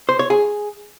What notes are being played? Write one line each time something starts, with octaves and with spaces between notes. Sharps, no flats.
C5
C#5
G#4